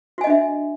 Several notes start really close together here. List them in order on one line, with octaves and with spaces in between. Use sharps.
F#4 G#5 D#5 D4 E5